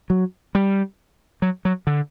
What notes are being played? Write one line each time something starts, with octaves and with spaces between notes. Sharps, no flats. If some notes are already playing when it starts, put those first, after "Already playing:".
F#3
G3
F#3
F#3
D3